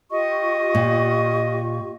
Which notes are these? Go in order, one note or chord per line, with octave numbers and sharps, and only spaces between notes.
F4 G4 D#5 C#6
A#2